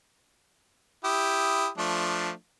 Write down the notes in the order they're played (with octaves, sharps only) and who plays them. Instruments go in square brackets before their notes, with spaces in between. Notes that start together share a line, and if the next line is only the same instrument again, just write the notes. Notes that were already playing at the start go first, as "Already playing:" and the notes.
[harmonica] E4 G4 D#6
F3 A3 D4